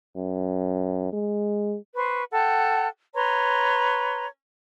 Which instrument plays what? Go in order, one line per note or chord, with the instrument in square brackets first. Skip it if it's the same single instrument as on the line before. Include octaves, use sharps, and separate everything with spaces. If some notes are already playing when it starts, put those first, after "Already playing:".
[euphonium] F#2
G#3
[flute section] B4 C5 C#6
A4 F#5 G5 A5
B4 C#5 A#5 C6